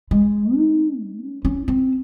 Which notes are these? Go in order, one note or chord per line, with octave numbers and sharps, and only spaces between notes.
G#3
D#4
G3
C#4
C#4
C4